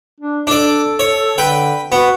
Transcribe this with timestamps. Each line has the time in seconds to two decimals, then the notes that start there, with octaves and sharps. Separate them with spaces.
0.20 D4
0.47 D4 A4 D5
0.99 C#5
1.38 D3 B4 G5
1.92 B3 F#4